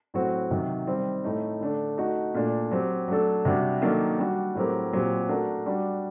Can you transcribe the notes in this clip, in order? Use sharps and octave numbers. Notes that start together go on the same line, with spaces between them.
A2 F#3 C4 F#4
C3 D#3 F#3
D#3 G3 C4
A2 A3 D#4
D3 A3 D4
A3 D#4 F#4
A#2 A3 D4
F#3 C4 G4
F#3 A3 D4 A4
C3 G3 D4 F#4
D#3 F#3 A#3 D4 A4
G3 D4 F#4
A2 F#3 C4 G4 A#4
A#2 F#3 C4 G4
A3 D4 F#4 A#4
G3 D4 F#4